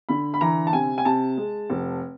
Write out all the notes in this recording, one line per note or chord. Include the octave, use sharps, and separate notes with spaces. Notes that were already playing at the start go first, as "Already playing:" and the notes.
D3 B5
B5
E3 A#5
A5
C3 G#5
G#5
C3 A5
G#3
F1